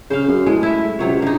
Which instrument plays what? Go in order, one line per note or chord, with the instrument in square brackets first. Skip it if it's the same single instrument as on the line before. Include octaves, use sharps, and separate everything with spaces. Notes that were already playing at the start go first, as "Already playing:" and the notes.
[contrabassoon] C#3 [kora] C5 F5
[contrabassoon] F#2
[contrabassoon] A2 [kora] G#3
[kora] E4 E5
[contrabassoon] C#2 [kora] C3 F#3 C#5
[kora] D3 D#4